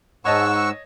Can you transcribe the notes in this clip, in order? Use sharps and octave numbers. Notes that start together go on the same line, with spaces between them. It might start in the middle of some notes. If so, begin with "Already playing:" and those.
G#2 C#5 D#5 F#5 A5 C#6 E6